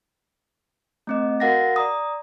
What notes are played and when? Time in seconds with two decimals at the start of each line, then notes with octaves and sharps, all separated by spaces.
1.07 A3 C4 D#5
1.40 F#4 A#4 F5 F#5 A6 A#6
1.76 D5 A#5 D#6